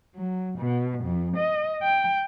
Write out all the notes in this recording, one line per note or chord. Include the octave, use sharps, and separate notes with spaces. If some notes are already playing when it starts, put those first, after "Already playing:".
F#3
B2
F2
D#5
G5